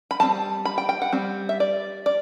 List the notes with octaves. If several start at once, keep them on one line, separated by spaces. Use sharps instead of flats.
B5
G3 C4 A5
B5
G5
G5
F#5
G3 C4
E5
D5
D5